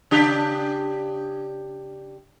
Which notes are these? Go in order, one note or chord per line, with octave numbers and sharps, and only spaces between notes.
C#3 D4 G4